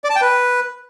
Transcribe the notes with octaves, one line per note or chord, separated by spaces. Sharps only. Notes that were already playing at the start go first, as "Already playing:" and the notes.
D5
A5
G5
B4